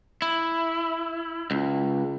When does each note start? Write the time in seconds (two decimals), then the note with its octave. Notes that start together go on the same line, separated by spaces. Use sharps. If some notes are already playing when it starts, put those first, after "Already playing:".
0.22 E4
1.51 C#2